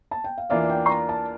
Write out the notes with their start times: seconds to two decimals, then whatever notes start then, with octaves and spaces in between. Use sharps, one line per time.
0.11 A5
0.24 G5
0.38 F5
0.50 E2 E3 A#3 D4 F4 E5
0.70 G5
0.86 C6
0.89 A#5
1.09 A5